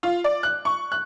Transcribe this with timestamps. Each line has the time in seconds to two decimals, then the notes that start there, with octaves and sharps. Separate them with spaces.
0.03 F4
0.24 D5
0.43 F#6
0.65 C#6
0.92 F#6